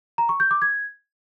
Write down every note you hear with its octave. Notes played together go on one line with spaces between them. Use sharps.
A#5
C#6
G6
D6
G#6